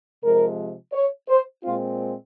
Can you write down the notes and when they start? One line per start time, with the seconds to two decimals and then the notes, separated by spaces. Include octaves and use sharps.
0.23 C3 F3 G#3 A#4
0.93 C#5
1.29 C5
1.64 A#2 G#3 C4 F4